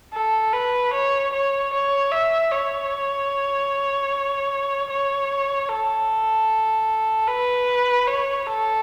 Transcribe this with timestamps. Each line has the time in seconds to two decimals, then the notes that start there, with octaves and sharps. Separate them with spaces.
0.13 A4
0.53 B4
0.93 C#5
1.33 C#5
1.73 C#5
2.12 E5
2.52 C#5
4.90 C#5
5.69 A4
7.28 B4
8.07 C#5
8.47 A4